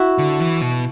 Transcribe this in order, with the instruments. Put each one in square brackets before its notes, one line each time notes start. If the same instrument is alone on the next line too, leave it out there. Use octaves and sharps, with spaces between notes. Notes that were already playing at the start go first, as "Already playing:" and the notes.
Already playing: [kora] E4 F#4
[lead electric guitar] D3
E3
B2